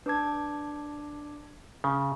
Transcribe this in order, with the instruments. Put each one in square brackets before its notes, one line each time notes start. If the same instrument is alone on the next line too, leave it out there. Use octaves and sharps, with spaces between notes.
[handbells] D4 D6 G#6 [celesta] B4 A5
[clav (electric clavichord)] C#3 [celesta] C#6